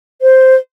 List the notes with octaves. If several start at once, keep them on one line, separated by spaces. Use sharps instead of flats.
C5